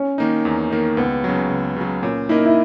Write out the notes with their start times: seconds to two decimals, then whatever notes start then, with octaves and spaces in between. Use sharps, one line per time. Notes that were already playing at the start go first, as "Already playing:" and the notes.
Already playing: C#4
0.18 D#3 A#3 D#4
0.45 E2
0.71 D#3 A#3 D#4
0.97 C#2 B3
1.24 C#3 F#3
1.50 C#2
1.76 C#3 F#3
2.03 A#2 C#4
2.29 A#3 D#4 E4 A#4 D#5
2.45 E4